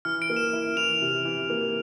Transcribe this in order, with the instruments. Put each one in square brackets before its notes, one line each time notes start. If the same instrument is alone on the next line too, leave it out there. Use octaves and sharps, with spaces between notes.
[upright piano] E3 [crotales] F6
[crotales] D7
[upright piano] A#3
[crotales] E7
[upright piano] E4
[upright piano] E3 [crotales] F7
[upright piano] C3
E3
A#3